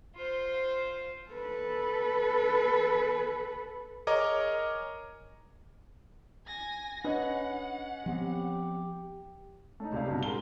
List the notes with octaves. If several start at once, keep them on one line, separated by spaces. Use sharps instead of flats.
F4 C5
A4 B4
G#4 A#4 C#5 D#5 A#5 D6
G#5 A#6
C#4 D4 B4 D#5 F#5
F3 B3 C4 G4
A3 C#4 D#4
C#2 C3 D5 F5
G2 B2
G#2 G#3 A#4 G7